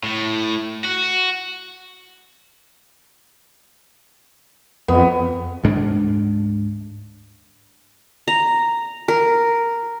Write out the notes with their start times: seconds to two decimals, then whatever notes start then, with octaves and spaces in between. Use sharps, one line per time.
0.04 A2
0.85 F#4
4.88 F2 B3
5.64 D2 G#2 G#3 D4
8.28 A#5
9.08 A#4